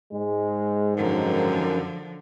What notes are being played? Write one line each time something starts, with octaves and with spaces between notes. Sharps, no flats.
G#2 G#3
F#2 D3 D#3 F3